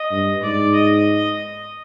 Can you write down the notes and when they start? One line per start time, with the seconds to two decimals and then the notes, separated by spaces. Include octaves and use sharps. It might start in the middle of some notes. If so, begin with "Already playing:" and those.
Already playing: D#5
0.11 G2
0.42 G#2 D5
0.74 D#5